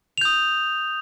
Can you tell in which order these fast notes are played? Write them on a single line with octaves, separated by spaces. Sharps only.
F7 G6 D#6